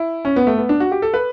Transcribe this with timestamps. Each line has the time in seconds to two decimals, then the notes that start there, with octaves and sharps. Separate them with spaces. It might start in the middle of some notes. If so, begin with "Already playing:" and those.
Already playing: E4
0.25 C#4
0.36 B3
0.47 A3
0.58 B3
0.69 D4
0.80 F#4
0.92 G4
1.02 A4
1.14 B4